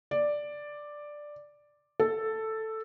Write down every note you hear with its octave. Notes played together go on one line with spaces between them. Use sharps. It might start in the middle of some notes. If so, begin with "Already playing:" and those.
D5
A4